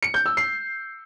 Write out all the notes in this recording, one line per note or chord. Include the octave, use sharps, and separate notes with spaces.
C#7
G6
E6
C7